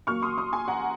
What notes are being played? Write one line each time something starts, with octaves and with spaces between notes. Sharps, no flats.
A#2 F#3 A#3 C#6 F6
C6 D#6
C6 D#6
G#5 C6
F#5 A#5